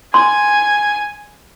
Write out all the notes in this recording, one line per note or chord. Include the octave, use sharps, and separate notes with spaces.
G#5 C6